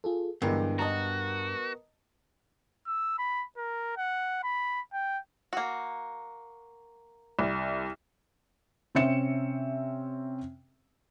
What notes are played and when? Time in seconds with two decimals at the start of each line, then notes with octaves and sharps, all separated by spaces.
0.04 F4 G#4 A4
0.42 G2 D3 E3 G#3 B3 A#4 B4
0.79 F#4 D#5 A5 A#5
2.87 E6
3.18 B5
3.57 A#4
3.97 F#5
4.43 B5
4.93 G5
5.53 A#3 F#4
7.39 C2
8.95 C3 C4 C#4 E5 C#7 E7